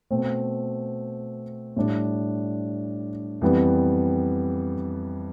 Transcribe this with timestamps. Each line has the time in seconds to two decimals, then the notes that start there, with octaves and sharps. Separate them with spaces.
0.10 B2 A3 C4
1.77 A2 G3 D4
3.41 F2 E3 G3 B3